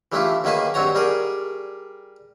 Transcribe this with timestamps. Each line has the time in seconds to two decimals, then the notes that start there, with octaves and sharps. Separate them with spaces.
0.12 E3 G3 A3 D4 E4 F4
0.44 F#2 D#3 A#3 G#4 B4 A5
0.74 G2 F#3 C4 F#4 C#5 A#5
0.95 G3 G#4 A#4 D5